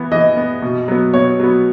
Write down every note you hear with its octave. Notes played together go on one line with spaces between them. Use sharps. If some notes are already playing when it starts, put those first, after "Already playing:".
Already playing: E3 B3
E3 D#5
B3
B2
F#3 B3
B2 C#5
F#3 B3